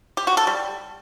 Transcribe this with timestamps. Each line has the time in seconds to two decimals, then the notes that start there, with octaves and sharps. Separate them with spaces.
0.17 G4
0.27 F#4
0.37 A4
0.47 G3